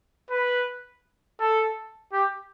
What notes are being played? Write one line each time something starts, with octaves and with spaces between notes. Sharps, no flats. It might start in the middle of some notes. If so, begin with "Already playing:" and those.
B4
A4
G4